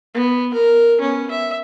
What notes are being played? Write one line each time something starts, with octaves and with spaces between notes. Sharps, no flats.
B3
A#4
B3 C#4
E5